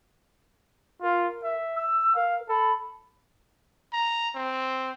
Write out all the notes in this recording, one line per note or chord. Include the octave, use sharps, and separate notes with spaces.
F4 A#4
E5
E6
A#4 F5
A4 B5
A#5
C4